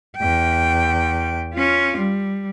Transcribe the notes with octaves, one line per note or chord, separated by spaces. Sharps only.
E2 G5
C#4 F4
G3